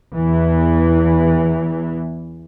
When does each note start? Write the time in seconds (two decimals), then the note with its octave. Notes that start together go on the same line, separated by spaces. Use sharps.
0.14 E2 E3